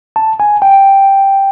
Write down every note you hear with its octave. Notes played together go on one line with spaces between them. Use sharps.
A5
G#5
G5